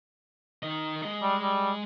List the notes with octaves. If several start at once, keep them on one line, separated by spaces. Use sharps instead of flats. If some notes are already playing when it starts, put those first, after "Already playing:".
D#3 D#5
G#3 D#5
G3
G3